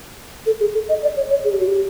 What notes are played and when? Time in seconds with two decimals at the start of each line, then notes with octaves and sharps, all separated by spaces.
0.46 A4
0.60 G#4
0.74 A4
0.89 D#5
1.03 D5
1.16 C#5
1.30 C#5
1.44 G#4
1.52 G4
1.60 F#4
1.67 G4